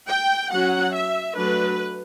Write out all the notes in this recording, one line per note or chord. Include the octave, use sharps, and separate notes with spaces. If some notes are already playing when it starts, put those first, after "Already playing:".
G5
F#3 C#4 F#5
E5
F#3 A3 D4 B4